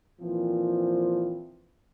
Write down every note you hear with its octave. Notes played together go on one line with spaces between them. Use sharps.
A#2 E3 F3 C4